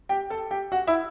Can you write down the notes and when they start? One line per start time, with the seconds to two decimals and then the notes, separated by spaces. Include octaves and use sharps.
0.09 G4 G5
0.30 A4 A5
0.51 G4 G5
0.72 F#4 F#5
0.87 E4 E5